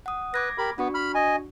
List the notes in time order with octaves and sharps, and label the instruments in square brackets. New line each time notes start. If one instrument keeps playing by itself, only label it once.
[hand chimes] F#5 D#6
[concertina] B4 [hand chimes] D6 G#6 A#6
[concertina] G4 A#4 B5
[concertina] B3 [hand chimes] D4 F#4 C#6
[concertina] B5 F6
D#5 G#5